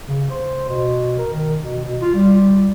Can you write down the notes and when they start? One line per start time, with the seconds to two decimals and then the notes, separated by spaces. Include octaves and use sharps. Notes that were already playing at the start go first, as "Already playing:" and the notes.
0.08 C#3
0.30 C5
0.69 B2
1.18 A#4
1.32 D#3
1.63 B2
1.82 B2
2.02 F4
2.15 G3